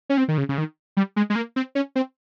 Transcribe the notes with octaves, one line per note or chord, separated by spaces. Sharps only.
C#4
C4
D#3
C#3
C#3
D#3
G3
G#3
G#3
A#3
C4
C#4
C4